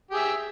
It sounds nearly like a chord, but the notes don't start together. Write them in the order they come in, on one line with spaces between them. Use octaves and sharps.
G4 G#4 E5